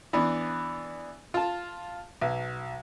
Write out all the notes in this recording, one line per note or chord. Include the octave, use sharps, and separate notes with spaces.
E3 B3 D4
F4 A5
B1